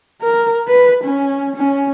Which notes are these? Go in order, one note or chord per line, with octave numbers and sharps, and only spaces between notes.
A#4
B4
C#4
C#4